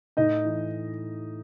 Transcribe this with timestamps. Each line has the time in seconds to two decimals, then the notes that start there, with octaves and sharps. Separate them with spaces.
0.17 A2 D#4 D#5
0.45 E3